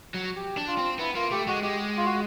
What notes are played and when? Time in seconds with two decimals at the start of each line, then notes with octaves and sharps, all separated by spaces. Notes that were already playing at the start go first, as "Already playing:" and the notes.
0.14 F#3
0.36 G4
0.57 D4
0.67 F4
0.78 C4
0.99 B3 E4
1.15 A#3 F4
1.31 A3 G4
1.47 G#3 F#4
1.63 G#3 G4
1.97 F4
2.05 F#4